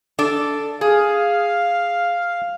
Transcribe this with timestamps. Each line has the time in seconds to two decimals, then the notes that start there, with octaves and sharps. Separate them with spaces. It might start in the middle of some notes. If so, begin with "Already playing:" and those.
0.19 D4 A4 D5
0.81 G#4 F5